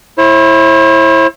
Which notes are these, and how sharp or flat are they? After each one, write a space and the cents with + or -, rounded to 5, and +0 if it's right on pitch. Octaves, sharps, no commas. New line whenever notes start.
E4 +0 C5 +45